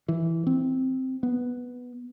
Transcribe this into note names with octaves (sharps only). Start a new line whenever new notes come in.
E3
C4
B3